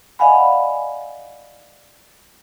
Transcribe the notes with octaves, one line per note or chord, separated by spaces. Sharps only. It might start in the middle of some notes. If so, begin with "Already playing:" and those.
D5 D#5 F5 F#5 G#5 B5